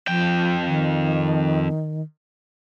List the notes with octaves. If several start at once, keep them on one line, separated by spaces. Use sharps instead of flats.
F2 F3 G5
D#3